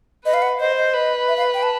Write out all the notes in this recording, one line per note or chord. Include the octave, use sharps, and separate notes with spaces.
B4 D#5
F5
F#5
C5 D#5
D#5
B4
E5
F5
G5
A5